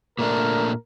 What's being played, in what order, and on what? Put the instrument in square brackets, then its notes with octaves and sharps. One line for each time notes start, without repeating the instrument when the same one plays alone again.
[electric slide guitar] A#2 A3 D4 [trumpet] A#4